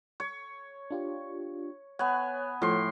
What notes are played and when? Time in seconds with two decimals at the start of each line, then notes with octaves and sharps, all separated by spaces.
0.20 C#5
0.91 D4 F4 G4
1.99 B3 C#5 G#5 F#6
2.62 A2 F3 A3 C6